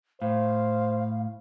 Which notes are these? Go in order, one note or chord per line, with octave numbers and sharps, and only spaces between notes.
A2 C5 F5